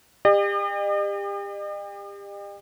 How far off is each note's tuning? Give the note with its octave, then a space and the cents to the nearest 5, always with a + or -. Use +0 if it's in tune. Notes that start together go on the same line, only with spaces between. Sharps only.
G4 +35 D#5 -45